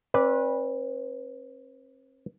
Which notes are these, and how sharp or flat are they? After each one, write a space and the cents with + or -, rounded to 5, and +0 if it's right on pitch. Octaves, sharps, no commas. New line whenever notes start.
C4 +45 B4 -15 D5 -10